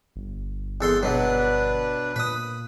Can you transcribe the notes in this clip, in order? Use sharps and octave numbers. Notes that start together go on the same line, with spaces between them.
G1
E2 A4 C6
B2 F#3 D4 B4
A#2 B4 D#6